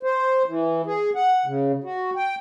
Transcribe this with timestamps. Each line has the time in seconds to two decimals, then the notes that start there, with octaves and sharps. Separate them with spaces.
0.03 C5
0.46 E3
0.86 G#4
1.15 F#5
1.46 C#3
1.84 F#4
2.16 G5